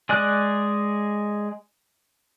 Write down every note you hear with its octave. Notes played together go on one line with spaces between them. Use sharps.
G#3 G#4 D5 D6 F#6